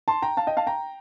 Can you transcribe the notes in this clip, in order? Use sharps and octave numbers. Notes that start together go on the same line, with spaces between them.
A5 C6
G5 A#5
F5 A5
D#5 G5
F5 A5
G5 A#5